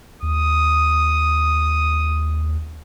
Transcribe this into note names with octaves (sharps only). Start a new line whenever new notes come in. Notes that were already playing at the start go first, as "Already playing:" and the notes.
D#2 D#6